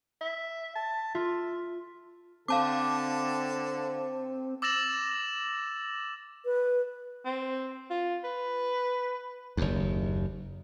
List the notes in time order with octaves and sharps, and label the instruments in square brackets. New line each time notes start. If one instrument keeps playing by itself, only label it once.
[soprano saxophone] E5
A5
[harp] F4 [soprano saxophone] E5
[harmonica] D3 A4 [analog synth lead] C4 [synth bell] F5 A5 D6
[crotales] D6 E6 A6 A#6 E7 F#7
[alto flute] B4
[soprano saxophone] C4
F4
B4
[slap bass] F#1 D#2